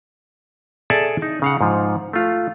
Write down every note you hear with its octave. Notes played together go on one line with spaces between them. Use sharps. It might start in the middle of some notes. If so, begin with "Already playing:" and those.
G#4 A4 D5 E5 G#5 A5
D#4
C#3 F5 F#5
G#2 F3
A3 F4